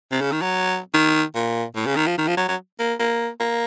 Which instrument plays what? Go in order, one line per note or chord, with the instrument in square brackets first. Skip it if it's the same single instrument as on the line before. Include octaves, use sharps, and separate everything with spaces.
[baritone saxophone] C3
C#3
D#3
F#3
D#3
A#2
A2
C#3
D#3
F3
D#3
F3
F#3
F#3
A#3
A#3
A#3